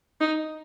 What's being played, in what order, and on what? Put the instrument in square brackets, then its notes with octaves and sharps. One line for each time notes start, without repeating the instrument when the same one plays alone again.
[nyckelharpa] D#4